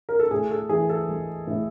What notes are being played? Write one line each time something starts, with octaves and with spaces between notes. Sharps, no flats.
A#4
A4
A2 G#4
A4
E3 G#4
A4
G#3
A2